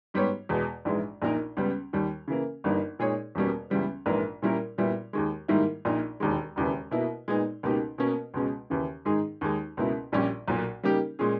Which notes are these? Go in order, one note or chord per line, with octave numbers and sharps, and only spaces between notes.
G#2 G3 B3 G4 C#5
E2 B2 G#3
A#1 G#2 E3 G#3
A#1 A#2 A#3 D#4 A#4
C#2 C#3 G3 B3
D#2 D#3 G3
C#3 E3 A#3
G1 G2 E3 A#3 D#4
A#2 G#3 D#4 G#4 C#5
E2 B2 G3 A#3 C#4
C#2 C#3 E3 G3 B3
A#1 G#2 E3 A#3
A#2 G3 C#4 E4 A#4
A#2 G3 B3 E4
D#2 D#3 G#3
G#2 D#3 G3 A#3 E4
A#1 A#2 A#3 D#4
E1 D#2 D#3 G#3
E1 D#2 C#3 E3
B2 A#3 E4
A#2 G#3 B3 D#4
C#2 B2 A#3 D#4 G4
B2 A#3 C#4
C#2 B2 G#3 C#4
D#2 C#3 E3
G#2 D#3 G#3 D#4 G#4
D#2 D#3 G#3 D#4
C#2 B2 A#3 E4
A#1 A#2 G3 C#4 G4
B1 A#2 A#3
C#3 G3 A#3 D#4 G4
A#2 G#3 C#4 G#4